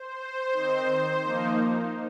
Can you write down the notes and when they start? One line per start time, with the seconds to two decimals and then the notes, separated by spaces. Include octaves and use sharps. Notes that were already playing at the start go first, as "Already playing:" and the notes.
Already playing: C5
0.53 D#3 C4 D#4
1.23 F3 A#3 D#4